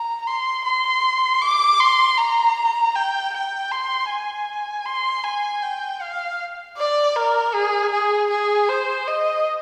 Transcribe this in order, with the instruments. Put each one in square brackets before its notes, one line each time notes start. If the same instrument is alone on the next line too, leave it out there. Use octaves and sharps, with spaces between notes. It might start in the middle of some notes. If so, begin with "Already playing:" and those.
Already playing: [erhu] A#5
C6
C6
D6
C6
A#5
G5
G5
C6
G#5
C6
G#5
G5
F5
D5
A#4
G#4
G#4
G#4
C5
D#5